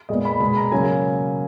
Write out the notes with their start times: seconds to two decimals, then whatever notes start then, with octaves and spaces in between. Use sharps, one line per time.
0.09 A#2 G#3 B3 D#5
0.25 B5
0.40 B2 G#3 B3 B5
0.57 A#5
0.72 C#3 F#3 A#3 G#5